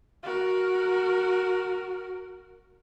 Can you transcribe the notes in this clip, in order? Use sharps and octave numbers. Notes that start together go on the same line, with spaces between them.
F#4 A#4